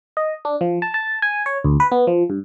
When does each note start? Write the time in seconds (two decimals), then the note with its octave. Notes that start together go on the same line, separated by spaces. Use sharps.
0.17 D#5
0.45 D4
0.61 F3
0.82 A5
0.94 A5
1.22 G#5
1.46 C#5
1.64 D2
1.80 B4
1.92 B3
2.07 F3
2.30 G2